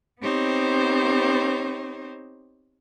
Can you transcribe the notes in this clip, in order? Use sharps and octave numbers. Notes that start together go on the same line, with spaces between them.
B3 C4 D#4 G4 C5 C#5